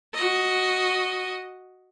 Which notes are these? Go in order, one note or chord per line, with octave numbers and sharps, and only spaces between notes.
F#4 D#5